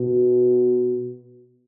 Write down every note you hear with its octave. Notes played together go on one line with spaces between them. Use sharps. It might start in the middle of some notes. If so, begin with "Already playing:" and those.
Already playing: B2